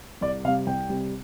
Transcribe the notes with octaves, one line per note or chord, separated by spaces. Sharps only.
C2 D5
C3 G3 F5
C2 G5
C3 G3